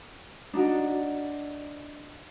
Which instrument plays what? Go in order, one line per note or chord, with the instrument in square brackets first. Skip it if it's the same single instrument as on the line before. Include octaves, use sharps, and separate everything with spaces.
[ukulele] D4 D#4 F#4